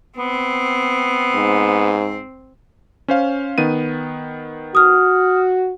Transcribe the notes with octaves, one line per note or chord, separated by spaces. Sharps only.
B3 C4
G#2
C#4 C5 F5
D#3 B3 D#7
F#4 D#6 F6